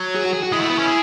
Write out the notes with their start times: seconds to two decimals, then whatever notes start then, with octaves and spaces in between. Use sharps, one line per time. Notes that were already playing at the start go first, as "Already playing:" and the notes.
Already playing: F#3
0.15 G#4
0.25 F#4
0.33 G#4
0.43 F#4
0.52 G#3 E4
0.61 A3
0.70 B3
0.79 C#4
0.87 G#4